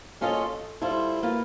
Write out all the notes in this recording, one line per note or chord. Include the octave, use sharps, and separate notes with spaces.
A#3 C#4 F4 A4 C#5 D#5
A4
G3 E4 F4 A4 C5
A#3 F4 B4